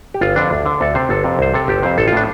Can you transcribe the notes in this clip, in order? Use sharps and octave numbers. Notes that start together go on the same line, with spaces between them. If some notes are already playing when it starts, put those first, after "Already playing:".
G4
G1 F4
F2 D3 D4
D2
D3
D2 A4
C3 C5
G1 A4
F2 C3
C2 C5
C3 A4
G1 G4
F2 C3 C5
A1 A4
F4
A2 D4